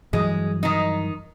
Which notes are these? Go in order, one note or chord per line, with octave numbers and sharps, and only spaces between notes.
G2 E3 F#3 G#3
D#3 D#4